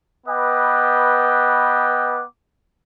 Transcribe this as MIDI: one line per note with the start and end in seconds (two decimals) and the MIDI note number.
0.27 2.23 59
0.27 2.23 71
0.27 2.23 75
0.27 2.23 79
0.27 2.23 86